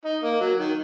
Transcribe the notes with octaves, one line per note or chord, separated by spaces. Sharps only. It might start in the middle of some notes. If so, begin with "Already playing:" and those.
D#4
A#3
F#3
D#3